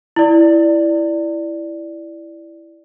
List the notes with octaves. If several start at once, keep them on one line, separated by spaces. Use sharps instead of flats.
E4 D5